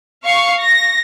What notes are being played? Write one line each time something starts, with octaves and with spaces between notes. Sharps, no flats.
F5 C#6
A#6